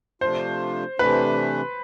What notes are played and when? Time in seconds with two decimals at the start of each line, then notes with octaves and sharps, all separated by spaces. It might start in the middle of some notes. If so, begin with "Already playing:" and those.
0.21 C3 F3 A3 D4 F4 C5
0.99 C3 E3 A3 D4 B4